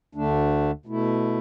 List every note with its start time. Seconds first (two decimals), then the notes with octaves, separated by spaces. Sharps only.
0.15 D2 D3 A3 D4
0.86 B2 A3 E4